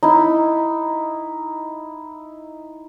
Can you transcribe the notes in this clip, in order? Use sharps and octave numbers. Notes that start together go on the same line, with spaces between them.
D#4 E4